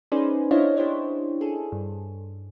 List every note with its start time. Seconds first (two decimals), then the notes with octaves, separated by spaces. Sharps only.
0.12 C#4 D#4 G#4 B4 C5 D5
0.51 D4 E4 C5 C#5 D#5 F5
0.77 D4 E4 G4 C5 C#5
1.41 G#4 A4
1.72 G2